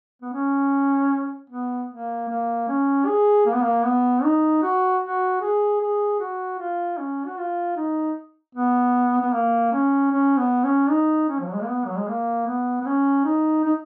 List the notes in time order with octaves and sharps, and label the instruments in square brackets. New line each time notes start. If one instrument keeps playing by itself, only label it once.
[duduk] B3
C#4
B3
A#3
A#3
C#4
G#4
A#3
B3
A#3
B3
D#4
F#4
F#4
G#4
G#4
F#4
F4
C#4
F#4
F4
D#4
B3
B3
A#3
C#4
C#4
B3
C#4
D#4
C#4
F3
F#3
G#3
A#3
B3
F#3
G#3
A#3
B3
B3
C#4
D#4
D#4